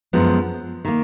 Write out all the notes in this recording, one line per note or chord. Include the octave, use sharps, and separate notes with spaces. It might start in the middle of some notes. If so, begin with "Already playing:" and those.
F#2 F3 G#3 B3
D#3 A#3